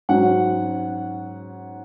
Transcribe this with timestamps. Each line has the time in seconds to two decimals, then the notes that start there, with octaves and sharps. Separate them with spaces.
0.09 G#2 F#3 C#4 F#5